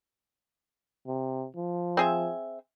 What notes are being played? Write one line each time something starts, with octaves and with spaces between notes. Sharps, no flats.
C3
F3
C4 G#4 E5